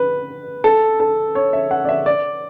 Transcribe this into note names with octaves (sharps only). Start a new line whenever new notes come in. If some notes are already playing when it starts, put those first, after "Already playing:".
Already playing: B4
A4
A4
C#5
E5
F#5
D5
E5
D5